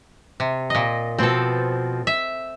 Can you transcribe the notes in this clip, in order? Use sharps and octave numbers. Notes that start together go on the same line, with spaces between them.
C3
A#2 D#5
B2 F3 C4 A4
E5